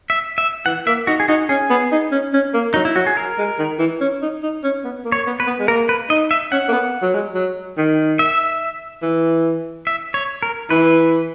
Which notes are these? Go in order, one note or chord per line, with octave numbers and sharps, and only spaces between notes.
E5
E5
E3 F#5
A#3 E5
D#4 F#4
G#4
D#4 F#4
C#4 G#4
B3
D#4
C#4
C#4
A#3
F#3 D#4
E4
F#3 F#4
G#4
A#4
G#3
D#3
E3
C#4
D#4
D#4
C#4
B3
A#3
C#5
B3
B4
B3
G#3
A#3 A#4
B4
D#4 D#5
E5
C#4 F#5
A#3
B3
F#3
G#3
F#3
D#3
E5
E3
E5
C#5
A#4
E3 B4